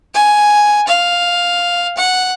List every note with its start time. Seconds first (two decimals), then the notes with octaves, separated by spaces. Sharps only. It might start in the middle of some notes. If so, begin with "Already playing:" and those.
0.15 G#5
0.87 F5
1.97 F#5